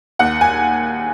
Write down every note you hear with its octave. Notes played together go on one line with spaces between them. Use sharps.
D#2 F#5
G#5